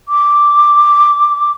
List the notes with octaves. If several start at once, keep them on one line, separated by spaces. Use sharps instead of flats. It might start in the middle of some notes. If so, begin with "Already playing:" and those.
D6